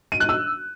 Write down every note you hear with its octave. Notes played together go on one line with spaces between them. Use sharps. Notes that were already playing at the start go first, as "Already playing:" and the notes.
D#7
F#6
E6